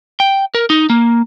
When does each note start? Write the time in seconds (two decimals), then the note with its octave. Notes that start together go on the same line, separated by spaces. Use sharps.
0.20 G5
0.55 A#4
0.70 D#4
0.90 A#3